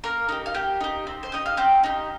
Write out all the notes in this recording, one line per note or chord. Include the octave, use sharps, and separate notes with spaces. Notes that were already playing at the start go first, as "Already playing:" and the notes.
A#3 A#4 A#5
D#4 G4
F5
A#3 G4 G5
D#4 G4
C4
C5
D#4 G4 D#5
F5
C4 G4 G5
D#4 G4